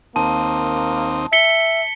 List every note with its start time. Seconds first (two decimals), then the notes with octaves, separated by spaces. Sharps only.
0.16 D#2 A#3 C4 A5 D#6
1.33 E5 B6 C#7 G7